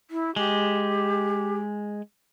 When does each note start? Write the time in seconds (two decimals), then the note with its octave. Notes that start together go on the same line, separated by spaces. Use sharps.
0.11 E4
0.36 G#3 G4